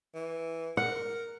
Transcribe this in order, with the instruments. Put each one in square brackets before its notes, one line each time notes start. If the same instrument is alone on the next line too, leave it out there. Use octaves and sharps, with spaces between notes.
[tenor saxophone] E3
[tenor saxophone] A#4 [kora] F#5